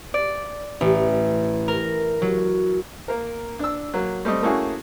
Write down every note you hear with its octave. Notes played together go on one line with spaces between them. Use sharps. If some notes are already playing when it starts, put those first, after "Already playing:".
D5
A1
A#4
F#3
A#3 A#4
D4 E6
F#3 A#3
G3 A3 C4 D#5
A3 A#3 C#4 E4 F#4 G#4